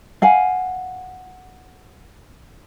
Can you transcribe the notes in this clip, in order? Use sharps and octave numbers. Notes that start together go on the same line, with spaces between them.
F5 F#5 G#5